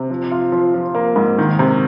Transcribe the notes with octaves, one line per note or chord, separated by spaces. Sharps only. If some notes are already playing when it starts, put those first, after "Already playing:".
Already playing: C3
F3
F4
F3
F3
A#3
G#2
D#3
C3